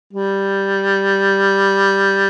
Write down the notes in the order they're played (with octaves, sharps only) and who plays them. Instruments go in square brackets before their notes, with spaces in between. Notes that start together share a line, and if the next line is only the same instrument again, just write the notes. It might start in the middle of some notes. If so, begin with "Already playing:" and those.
[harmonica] G3